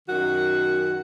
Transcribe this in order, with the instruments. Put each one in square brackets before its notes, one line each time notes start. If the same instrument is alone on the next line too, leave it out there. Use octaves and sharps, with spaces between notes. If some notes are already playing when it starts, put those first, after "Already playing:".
[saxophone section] F#2 D#3 F#4 F#5